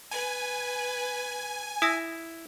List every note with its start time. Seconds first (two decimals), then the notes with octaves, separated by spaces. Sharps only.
0.11 B4 G#5
1.82 E4 D#6 E6 A#6